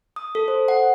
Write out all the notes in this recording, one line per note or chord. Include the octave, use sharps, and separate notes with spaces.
D#6
A4
C5
F#5